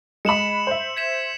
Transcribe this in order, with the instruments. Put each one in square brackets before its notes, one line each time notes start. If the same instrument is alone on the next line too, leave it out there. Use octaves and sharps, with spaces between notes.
[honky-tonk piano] G#3 B5 [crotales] C#7 E7 F#7
[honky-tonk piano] C5 E5
[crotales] G#6 B6 E7